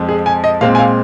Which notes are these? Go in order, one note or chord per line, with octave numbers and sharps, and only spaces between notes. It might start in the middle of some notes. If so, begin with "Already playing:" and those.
Already playing: F2 F3 G#3
G#4
G#5
D#5
A#2 G#3 C4 F5
G#5
F5